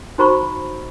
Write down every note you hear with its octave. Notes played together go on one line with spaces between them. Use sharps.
D#4 F#4 C5 A#5 B5 C#6